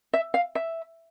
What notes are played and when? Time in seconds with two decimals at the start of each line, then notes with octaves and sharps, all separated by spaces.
0.13 E5
0.34 F5
0.55 E5